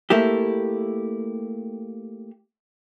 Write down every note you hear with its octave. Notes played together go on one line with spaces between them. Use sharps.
A3 A#3 E4 G4